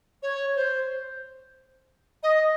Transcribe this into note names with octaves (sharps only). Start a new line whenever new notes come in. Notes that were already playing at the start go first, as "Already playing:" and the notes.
C#5
C5
D#5